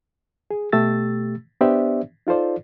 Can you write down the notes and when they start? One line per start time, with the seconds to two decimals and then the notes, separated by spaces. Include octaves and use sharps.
0.51 G#4
0.73 B2 A3 G4 E6 A6
1.61 B3 D4 G4 C5 D5 E5
2.27 D#4 F4 A4 C5 D5